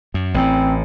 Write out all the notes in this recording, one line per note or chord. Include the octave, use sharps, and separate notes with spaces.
F#2
A1 A2 C4